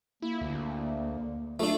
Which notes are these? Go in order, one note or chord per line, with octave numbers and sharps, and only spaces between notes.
A#3 E4
D2
F#3 A3 D4 F4